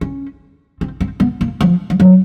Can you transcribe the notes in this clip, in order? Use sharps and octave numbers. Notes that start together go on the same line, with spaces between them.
C#4
C4
C4
B3
A#3
F3
F3
F#3